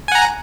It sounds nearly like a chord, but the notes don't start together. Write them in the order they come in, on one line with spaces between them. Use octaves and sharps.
G#5 F#5 A#5